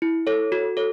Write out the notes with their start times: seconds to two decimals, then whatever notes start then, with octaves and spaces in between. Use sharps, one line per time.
0.02 E4
0.27 A4 C#5
0.52 F#4
0.77 A4 C#5